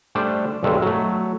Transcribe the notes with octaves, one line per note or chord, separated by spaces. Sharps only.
G3 A3 D4 C5 D5 A5
B1 G2 D#3 G#3 A4 E5
F#3 A3